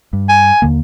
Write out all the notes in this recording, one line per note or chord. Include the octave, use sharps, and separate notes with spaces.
G2
G#5
D#2 D3 A#3